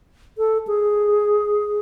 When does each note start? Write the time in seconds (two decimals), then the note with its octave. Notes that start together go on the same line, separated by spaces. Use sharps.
0.38 A4
0.67 G#4